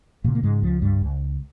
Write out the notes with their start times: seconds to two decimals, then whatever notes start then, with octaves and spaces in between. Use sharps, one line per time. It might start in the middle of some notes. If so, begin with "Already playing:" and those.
0.24 A#2 C#3 A#3
0.35 A#3
0.43 G#2 G#3
0.63 C#2 F3
0.82 G2 G3
1.01 C#2